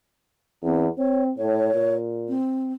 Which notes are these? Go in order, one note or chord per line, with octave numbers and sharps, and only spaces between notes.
E2 C4
C4 C#5
A2 C#5
A#2
C4